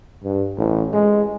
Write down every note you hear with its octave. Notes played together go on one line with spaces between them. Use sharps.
G2
A1
G#3